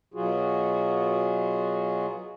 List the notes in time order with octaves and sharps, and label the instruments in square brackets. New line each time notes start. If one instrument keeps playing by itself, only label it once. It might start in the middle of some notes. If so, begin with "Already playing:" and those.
[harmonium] B2 F#3 F4 F#4 G#4